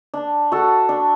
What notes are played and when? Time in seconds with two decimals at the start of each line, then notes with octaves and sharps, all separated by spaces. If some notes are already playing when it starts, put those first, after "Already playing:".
0.14 D4
0.52 F#4 A4
0.89 D4